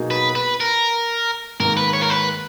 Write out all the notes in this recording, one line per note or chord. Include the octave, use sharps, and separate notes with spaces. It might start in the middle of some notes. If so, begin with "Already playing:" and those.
Already playing: B2 F#3 A#3 D#4 G#4
B4
B4
A#4
G#2 D#3 A#3 A#4
B4
C#5
A#4
B4